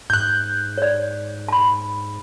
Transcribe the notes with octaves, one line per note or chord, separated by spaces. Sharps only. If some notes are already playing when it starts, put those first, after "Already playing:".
G#2 F#6 G6
C#5 D5
A5 B5